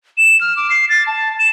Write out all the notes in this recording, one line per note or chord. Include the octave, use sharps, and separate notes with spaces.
E7
F6
D6
C7
A6
A5
E7